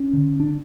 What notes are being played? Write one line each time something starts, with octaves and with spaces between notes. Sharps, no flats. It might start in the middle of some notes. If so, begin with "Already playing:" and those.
Already playing: C#4
D3
D4